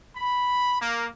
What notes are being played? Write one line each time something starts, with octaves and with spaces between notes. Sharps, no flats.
B5
A#3